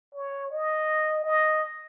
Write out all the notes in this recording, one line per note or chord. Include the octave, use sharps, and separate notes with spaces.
C#5
D#5
D#5